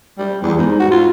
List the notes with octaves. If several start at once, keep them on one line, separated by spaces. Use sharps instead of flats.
G3
E2
G#2
F#4
F4